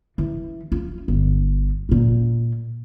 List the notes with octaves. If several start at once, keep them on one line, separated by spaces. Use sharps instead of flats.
E3
F4
G1
A#2 A#3